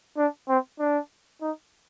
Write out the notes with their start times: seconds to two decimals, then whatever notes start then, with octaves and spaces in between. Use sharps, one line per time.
0.17 D4
0.48 C4
0.79 D4
1.42 D#4